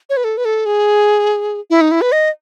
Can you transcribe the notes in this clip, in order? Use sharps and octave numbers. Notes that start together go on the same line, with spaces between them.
C#5
B4
A4
B4
A4
G#4
E4
D#4
E4
B4
D#5